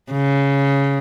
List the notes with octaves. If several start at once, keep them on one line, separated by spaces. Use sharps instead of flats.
C#3